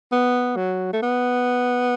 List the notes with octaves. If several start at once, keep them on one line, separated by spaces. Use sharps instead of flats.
B3
F#3
A3
B3